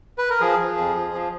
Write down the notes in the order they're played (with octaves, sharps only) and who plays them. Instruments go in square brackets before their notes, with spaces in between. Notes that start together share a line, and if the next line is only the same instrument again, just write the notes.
[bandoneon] B4
A#4
F3 G#4
F3
F2
F3
F3